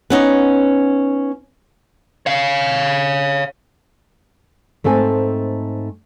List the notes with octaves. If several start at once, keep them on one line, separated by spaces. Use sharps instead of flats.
B3 C#4 D#4
C#5 F5
G#2 A3 C4 A4 G#5